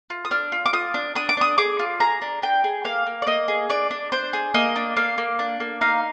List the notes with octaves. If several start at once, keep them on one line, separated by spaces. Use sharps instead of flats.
F4
D#6
D4 F6
F4
D6
F4 D#6
D4
D4 D#6
D6
D4 D#6
G#4 D6
F4
G#4 A#5
D4
D4 G5
G#4
A#3 F5
A#3
D5
A#3 D#5
G#4
D4 D5
D4
D4 C5
G#4
A#3 D#5
D4
A#3 F5
A#3
D4
A#3
D#4 F5